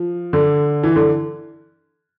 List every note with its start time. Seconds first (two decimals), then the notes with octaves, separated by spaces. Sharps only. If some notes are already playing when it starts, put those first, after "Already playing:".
Already playing: F3
0.33 D3
0.83 E3
0.96 D3